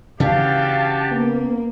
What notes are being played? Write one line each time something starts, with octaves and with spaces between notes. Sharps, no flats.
C#3 E3 C#4 D4 F#4 G4 F5 A5
A#3 B3